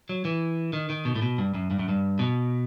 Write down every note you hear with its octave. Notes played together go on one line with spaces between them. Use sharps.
F#3
E3
D#3
D#3
B2
A2
B2
G2
F#2
G2
F#2
G2
B2